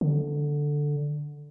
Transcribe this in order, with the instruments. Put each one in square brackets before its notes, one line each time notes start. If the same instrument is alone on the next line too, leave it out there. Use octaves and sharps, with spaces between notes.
[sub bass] D3